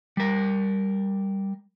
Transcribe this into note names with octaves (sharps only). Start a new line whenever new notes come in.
G3 A#4